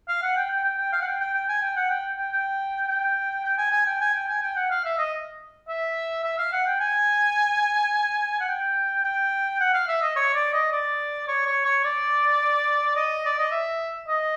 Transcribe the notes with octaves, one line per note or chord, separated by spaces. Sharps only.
F5
F#5
G5
G5
G5
G5
F5
F#5
G5
G5
G5
G#5
G5
F#5
G5
G5
G5
G5
G5
G#5
G#5
G5
G#5
G5
G#5
G5
F#5
F5
E5
D#5
E5
E5
F5
F#5
G5
G#5
F#5
G5
G5
F#5
F5
E5
D#5
C#5
D5
D#5
D5
C#5
C#5
C#5
D5
D#5
D5
D#5
E5
D#5